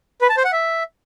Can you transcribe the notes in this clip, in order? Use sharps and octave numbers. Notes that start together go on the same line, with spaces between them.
B4
A5
C5
F#5
E5